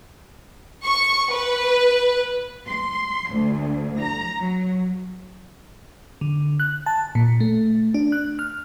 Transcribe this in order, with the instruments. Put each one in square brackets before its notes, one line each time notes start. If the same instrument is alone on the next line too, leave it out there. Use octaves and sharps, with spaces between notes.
[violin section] C#6
B4
[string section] C6
D2
A#5
F#3
[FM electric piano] D3
F#6
A5
A#2
A3
D4
F#6
F6